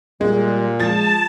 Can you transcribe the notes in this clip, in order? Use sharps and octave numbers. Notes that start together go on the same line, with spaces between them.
A#2 G3 G#3
F3 G#3 A5 A6